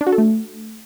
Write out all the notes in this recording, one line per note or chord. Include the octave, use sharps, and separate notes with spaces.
D4
F#4
A4
A3